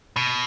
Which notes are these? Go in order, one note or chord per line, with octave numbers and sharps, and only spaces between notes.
B2